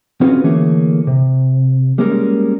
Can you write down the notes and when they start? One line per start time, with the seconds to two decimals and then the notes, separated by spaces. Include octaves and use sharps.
0.21 C4 C#4 F4 F#4 G#4 B4
0.44 D3 E3 A3 A#3 G#4 C#5
1.07 C3
1.98 G3 G#3 A#3 C#4 G#4 A#4